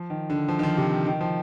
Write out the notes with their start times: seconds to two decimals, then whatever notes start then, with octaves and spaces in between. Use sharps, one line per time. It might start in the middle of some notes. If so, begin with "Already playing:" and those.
Already playing: F3
0.10 D#3
0.30 D3
0.48 F3
0.59 D#3
0.63 F3
0.77 C3
1.07 D#3
1.21 F3